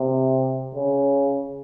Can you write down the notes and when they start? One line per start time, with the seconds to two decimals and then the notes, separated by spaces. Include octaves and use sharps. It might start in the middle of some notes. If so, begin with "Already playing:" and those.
Already playing: C3
0.74 C#3